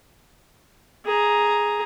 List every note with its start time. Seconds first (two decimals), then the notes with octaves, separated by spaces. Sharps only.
1.05 G#4 A#5